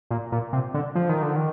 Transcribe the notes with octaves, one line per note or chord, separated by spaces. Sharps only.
A#2
A#2
C3
D3
F3
D#3
D3
D#3